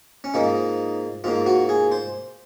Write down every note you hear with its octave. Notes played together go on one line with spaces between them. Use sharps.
C#4
G#2 F3 A#3 D#4
G#2 F3 A#3 F4
F#4
G#4
C5